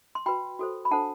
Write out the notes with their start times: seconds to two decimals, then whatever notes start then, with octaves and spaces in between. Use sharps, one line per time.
0.15 C6
0.26 F#4 B4 G5 B5
0.59 F#4 A4 C5
0.85 B5
0.91 D4 A4 C5 F#5 A5